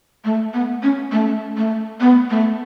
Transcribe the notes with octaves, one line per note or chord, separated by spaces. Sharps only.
A3
B3
C#4
A3
A3
B3
A3